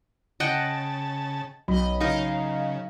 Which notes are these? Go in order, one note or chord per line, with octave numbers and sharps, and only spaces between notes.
C#3 D#5 F#5 G5 A5
B1 F#3 D#5 B5
C#3 D#4 A#4 D#5 F5